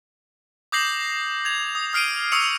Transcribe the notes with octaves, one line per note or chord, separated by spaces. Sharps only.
D6 D#6 G6 A#6 C7 F#7
G#6 F7
D#6
D#6 F6 C7 D7 D#7
C#6 D#6 E6 C#7 D7 F7